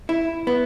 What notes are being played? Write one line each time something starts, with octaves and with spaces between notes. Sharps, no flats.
E4
B3